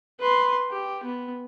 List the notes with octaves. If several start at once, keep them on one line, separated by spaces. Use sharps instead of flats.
B4 C6
G4
B3